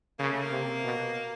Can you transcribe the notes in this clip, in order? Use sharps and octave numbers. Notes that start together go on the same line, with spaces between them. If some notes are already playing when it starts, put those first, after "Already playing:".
C#3 A#3
A3
A#3
C3
B2